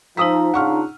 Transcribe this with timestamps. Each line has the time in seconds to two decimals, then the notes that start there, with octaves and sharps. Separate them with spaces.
0.17 F3 D#4 A#5 D#6 E6 B6
0.54 C#3 D4 F4 F#5 C#6 F6